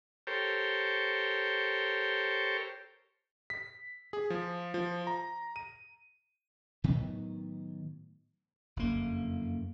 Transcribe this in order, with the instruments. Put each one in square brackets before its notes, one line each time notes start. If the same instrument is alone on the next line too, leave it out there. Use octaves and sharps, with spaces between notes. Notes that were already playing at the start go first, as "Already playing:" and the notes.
[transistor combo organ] G4 A4 A#4 C5 C#5 G5
[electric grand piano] B6
G#4
F3
F3
A#5
D#7
[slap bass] A2 D#3 F#3 B3
F#1 F2 A#3